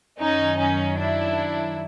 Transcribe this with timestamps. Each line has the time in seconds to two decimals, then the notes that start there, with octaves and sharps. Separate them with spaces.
0.20 F#2 D#3 F#3 C#4 D#4
0.59 C#4 D#4
0.99 D4 E4